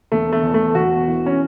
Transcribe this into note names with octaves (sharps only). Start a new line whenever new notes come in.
E1 A3
A3
E2
A3
E1 F#4
E3
C#4